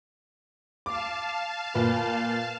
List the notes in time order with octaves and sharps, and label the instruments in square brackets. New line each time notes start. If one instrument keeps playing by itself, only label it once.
[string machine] F5 A5 [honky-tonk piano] D6
[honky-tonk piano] A#2 F4 B4